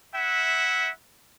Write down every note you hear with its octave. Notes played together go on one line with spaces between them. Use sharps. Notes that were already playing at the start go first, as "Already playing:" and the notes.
E4 E5 F#5